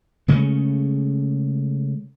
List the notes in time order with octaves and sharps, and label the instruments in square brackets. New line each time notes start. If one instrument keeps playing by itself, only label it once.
[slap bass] C#3 G#3 A3 C#4